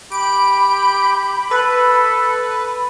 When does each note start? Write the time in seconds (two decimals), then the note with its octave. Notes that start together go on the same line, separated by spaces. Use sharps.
0.12 G4 B5 D7
1.51 A4 B4